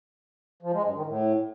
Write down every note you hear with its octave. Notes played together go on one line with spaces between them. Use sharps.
F3
G#3
G2
D#3
A2